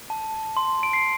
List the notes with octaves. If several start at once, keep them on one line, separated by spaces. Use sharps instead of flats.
A5
C6
D7
C7